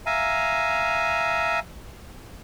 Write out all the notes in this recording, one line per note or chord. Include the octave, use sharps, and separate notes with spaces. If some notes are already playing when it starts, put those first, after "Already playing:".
E5 F5 G#5 A#5